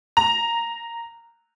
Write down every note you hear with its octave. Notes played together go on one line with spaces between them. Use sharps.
A#5